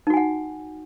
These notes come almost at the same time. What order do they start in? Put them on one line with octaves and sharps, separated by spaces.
D#4 F#4 G#5 F#5